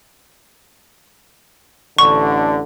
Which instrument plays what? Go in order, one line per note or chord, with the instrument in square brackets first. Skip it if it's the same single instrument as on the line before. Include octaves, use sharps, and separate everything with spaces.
[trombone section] A1 D3 [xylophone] C#6